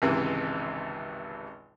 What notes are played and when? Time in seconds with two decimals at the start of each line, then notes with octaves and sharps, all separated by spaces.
0.02 G#1 C#2 G#2 C3 E3